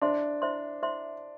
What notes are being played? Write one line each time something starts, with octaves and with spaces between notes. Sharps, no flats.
D4 E4 C5 E5 C6
E4 C5 E5 C6
E4 C5 E5 C6